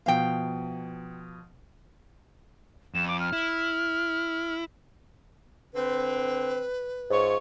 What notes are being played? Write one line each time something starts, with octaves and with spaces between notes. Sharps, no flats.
B2 F3 B3 F5 G5
F2 E7
D6
F6
E4
D3 C4 B4
G#2 F4 C#5